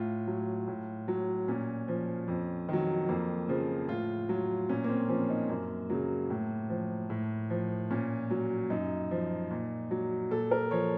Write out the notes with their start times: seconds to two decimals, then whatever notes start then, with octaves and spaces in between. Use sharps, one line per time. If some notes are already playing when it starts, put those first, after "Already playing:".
Already playing: A2 F4
0.28 F#3
0.68 A2
1.08 F#3
1.48 A#2 C#4
1.88 F3
2.28 F2
2.69 D#3 F#3
3.09 F2 A#3
3.49 C#3 F3
3.89 A2 F4
4.29 F#3
4.69 A#2 C#4
4.84 A#3
4.89 C4
5.09 F3 C#4
5.30 D#4
5.49 F#2 A#3
5.90 C#3 F#3
6.30 A2
6.70 F3
7.10 A2
7.50 F3
7.90 A#2 C#4
8.31 F#3
8.70 F#2 D#4
9.11 F3
9.51 A#2
9.91 F#3
10.31 A#2 A4
10.51 A#4
10.71 F3 C#5